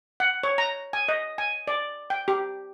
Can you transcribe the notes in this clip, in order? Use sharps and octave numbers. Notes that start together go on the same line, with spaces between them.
F#5
C#5
A#5
G#5
D#5
G#5
D5
G5
G4